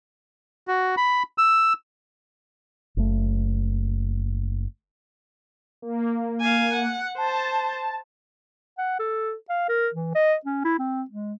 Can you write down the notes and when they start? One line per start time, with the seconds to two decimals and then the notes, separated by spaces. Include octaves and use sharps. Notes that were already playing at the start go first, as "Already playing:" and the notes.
0.68 F#4
0.97 B5
1.38 E6
2.97 F#1 A3
5.82 A#3
6.41 F5 G#5
6.73 F#5
7.18 C5 A5
8.78 F#5
8.99 A4
9.49 F5
9.69 A#4
9.94 E3
10.15 D#5
10.45 C#4
10.65 E4
10.79 C4
11.10 G#3